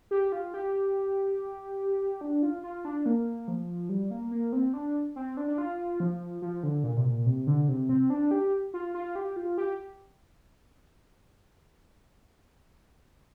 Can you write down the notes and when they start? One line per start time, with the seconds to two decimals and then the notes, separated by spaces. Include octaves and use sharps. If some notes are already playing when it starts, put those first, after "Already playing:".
0.11 G4
0.32 F4
0.54 G4
2.21 D4
2.43 F4
2.63 F4
2.85 D4
3.06 A#3
3.48 F3
3.89 G3
4.11 A#3
4.31 A#3
4.53 C4
4.74 D4
5.16 C4
5.37 D4
5.48 D4
5.58 F4
6.00 F3
6.42 F3
6.63 D3
6.83 A#2
6.97 C3
7.05 A#2
7.26 C3
7.47 D3
7.68 C3
7.89 C4
8.10 D4
8.31 G4
8.74 F4
8.94 F4
9.15 G4
9.36 F4
9.58 G4